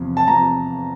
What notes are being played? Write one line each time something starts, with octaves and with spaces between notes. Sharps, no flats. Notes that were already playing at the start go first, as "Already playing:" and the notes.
Already playing: E2 C3 F3
A5
C3 F3 A#5